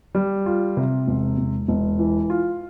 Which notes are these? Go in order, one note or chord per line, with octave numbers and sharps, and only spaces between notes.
G3
F4
C3
E1
E1
E1
E3
F4